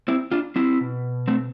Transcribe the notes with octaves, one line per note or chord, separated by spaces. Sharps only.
C4 E4
D4 F4
C4 E4
B2
A3 C4